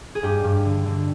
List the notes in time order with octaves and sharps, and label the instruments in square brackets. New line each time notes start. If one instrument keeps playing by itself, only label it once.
[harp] G#4
G2 G4
G2
D3
D3